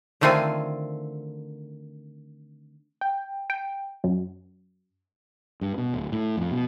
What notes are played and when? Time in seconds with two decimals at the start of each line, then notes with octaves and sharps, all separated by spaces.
0.21 D3 D#3 A3 C4 F4 G#5
3.01 G5
3.50 G5
4.04 F#2
5.61 G2
5.78 B2
5.94 D1
6.12 A2
6.37 F2
6.51 B2